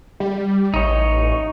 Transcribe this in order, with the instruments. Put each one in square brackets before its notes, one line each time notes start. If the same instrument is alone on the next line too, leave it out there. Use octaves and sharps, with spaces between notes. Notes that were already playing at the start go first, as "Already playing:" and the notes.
[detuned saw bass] G3
[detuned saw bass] A1 [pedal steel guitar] D#4 C#5